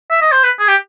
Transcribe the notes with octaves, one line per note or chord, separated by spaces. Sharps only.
E5
D#5
C5
B4
G#4
G4